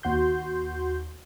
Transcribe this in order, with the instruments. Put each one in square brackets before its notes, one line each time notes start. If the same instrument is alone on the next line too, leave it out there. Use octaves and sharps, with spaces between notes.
[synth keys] D#2 F#4 C6 G6